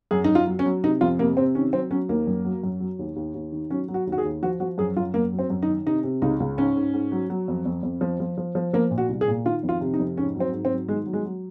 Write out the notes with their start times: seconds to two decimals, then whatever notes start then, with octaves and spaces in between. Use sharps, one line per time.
0.11 F#2 G#4
0.24 F#2 D#4
0.35 F4
0.47 F#3
0.59 C#4
0.66 F#3
0.84 C3 D#4
1.01 F2 F4
1.19 C3 A#3
1.37 C3 C4
1.55 D#3 C#4
1.73 F#3 C4
1.91 F#3 C#4
2.09 D#2 A#3
2.27 F#2
2.45 F#3
2.63 F#2
2.80 F#3
2.99 D#2
3.16 D#2
3.35 D#2
3.52 D#3
3.70 F#3 C#4
3.88 F#3
3.94 F#4
4.07 D#2
4.12 F#4
4.18 G#4
4.25 D#2
4.42 F3 F#4
4.60 F3 F#4
4.78 F#2 G#4
4.97 F#2 F4
5.14 F#2 A#3
5.33 F#3
5.39 C4
5.50 F#2
5.63 D#4
5.68 D#3
5.86 C3 D#4
6.04 C3
6.22 C#2 D#4
6.40 C#2
6.58 G#2 C#4
6.76 G#2
6.93 G#2
7.12 F#3
7.30 F#3
7.48 F2
7.65 F2
7.83 F2
8.01 F3
8.20 F3
8.38 F3
8.55 F3
8.73 F3 A#3
8.91 A#2
8.98 F#4
9.09 C2
9.21 G#4
9.28 A#2
9.46 D#3 F4
9.63 F2
9.69 F4
9.81 C3
9.94 D#4
9.99 F2
10.17 G#2 C#4
10.36 F#3 C4
10.53 G#2
10.65 C4
10.71 F#3
10.89 D#3 G#3
11.06 F#3
11.13 G#3
11.25 F#3